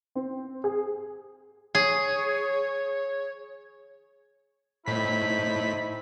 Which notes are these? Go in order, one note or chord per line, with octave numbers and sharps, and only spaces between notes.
C4
G#4
G#4 C#5
A2 C4 D#4 E4 B5 B6